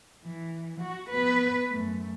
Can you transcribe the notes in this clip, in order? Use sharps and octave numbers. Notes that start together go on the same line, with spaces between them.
E3
F#4
B3 B4
F#2 A3